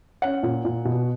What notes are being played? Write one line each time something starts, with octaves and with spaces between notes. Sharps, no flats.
C#4 F#5
A#2
A#2
B2